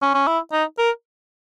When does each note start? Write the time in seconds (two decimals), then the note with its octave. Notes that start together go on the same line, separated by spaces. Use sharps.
0.02 C#4
0.14 C#4
0.27 E4
0.52 D#4
0.78 A#4